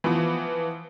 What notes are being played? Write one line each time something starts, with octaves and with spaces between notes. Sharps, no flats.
E3 F3 B3